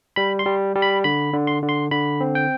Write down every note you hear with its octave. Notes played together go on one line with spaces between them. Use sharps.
G3 B5
C6
G3
G3
B5
D3 B5
D3
C6
D3
C6
D3 B5
C4
G5